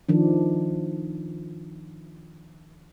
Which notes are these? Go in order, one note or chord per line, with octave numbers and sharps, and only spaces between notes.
D#3 F3 D4